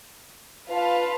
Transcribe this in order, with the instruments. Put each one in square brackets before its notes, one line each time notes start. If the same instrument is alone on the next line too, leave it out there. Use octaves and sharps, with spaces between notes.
[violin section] F4 B4 F5 A5